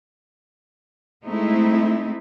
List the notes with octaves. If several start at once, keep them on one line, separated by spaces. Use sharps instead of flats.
G#3 A3 C4 D#4 E4